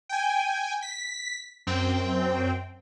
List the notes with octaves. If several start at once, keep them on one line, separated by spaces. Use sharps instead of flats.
G5 G#5
B6
F#2 C4 G5